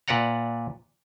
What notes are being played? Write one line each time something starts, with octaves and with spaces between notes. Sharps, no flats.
A#2 B4 D5 F#5 A#5